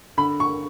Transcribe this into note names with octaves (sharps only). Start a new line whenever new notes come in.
D3 B5
C#6